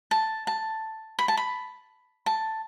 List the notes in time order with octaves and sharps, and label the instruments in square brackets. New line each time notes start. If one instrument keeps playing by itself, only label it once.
[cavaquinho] A5
A5
B5
A5
B5
A5